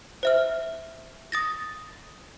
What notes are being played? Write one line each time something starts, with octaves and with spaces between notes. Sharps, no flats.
C5 E5 F6
D#6 A6 A#6